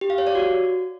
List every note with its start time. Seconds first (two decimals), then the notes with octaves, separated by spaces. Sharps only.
0.01 G4
0.10 F5
0.18 C#5
0.27 D5
0.35 F#4